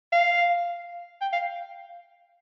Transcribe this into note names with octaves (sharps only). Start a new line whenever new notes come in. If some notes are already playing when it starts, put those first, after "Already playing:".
F5
G5
F5